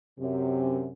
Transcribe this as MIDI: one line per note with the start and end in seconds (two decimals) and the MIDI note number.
0.20 0.90 42
0.20 0.90 48